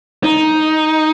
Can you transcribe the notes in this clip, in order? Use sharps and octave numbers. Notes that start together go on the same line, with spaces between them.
D#4